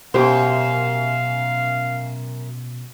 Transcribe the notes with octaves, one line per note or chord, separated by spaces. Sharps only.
F#2 B2 G4 C5 F5